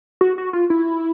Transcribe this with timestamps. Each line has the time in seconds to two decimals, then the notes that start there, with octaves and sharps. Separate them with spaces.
0.21 F#4
0.38 F#4
0.53 F4
0.70 E4